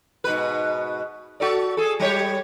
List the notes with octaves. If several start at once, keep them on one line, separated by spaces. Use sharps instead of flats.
G#2 B2 B4
F#4 A4 D5
G#4 A4
G3 G4 C#5